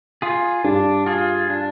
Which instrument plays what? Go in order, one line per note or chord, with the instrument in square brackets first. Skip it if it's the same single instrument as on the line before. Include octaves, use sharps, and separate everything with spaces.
[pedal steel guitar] F4 G#4
[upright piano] G2 G3 [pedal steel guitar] D4
[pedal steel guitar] F4 G#4
D4